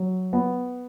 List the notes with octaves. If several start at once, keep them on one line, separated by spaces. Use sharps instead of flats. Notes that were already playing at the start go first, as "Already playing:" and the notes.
Already playing: F#3
B3